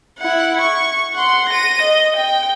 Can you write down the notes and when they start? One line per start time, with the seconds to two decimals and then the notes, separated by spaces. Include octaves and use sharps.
0.19 E4 F#5
0.61 C#6
1.14 F#5 C6
1.49 A#6 D#7
1.82 D#5
2.16 G5